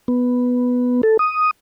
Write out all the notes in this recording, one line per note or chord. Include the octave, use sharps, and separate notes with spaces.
B3
A4
D#6